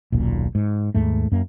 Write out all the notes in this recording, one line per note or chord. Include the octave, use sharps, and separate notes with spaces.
D#1 B1 A#2
G#2
D#2 G#2 A3
F#2 A#3